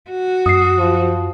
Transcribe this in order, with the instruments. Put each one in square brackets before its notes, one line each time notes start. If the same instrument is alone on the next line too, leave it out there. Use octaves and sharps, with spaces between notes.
[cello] F#4
[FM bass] F#2 [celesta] D#6 C7
[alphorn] F3